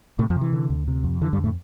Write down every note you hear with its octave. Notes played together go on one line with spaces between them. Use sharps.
A2 C3 A3
F2 F3
C3
E3
D3
D2
C3
F2
D3 E3
G2 G3
F2
A2 A3